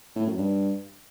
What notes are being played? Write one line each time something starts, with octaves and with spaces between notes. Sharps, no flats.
A2
F#2
G2